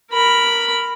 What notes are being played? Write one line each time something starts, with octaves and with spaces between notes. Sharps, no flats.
A#4 B5